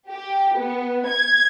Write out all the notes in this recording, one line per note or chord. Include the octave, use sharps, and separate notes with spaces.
G4
B3
G#6